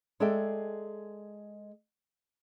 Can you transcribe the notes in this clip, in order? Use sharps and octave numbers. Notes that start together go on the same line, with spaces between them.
G#3 G#4 A4 D5 E5 G5